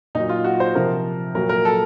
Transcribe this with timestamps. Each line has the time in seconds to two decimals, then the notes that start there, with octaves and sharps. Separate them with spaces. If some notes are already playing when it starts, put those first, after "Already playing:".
0.15 A#2 F#3 D#4
0.29 F4
0.44 F#4
0.60 C5
0.75 C3 F3 A#4
1.35 A#2 F#3 A#4
1.49 A#4
1.65 A4